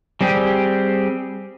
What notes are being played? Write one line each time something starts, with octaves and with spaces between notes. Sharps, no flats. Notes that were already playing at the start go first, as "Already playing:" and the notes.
G3 C4 G4 G#4